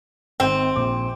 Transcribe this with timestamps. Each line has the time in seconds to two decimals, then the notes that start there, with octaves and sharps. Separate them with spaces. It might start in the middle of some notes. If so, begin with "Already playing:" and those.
0.40 G#1 C4
0.76 A#1 D6